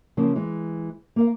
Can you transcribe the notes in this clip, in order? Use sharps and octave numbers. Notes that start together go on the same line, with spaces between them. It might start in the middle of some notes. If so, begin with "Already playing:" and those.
C#3 F3 A#3
E3 G#3
A#3 A#4 F5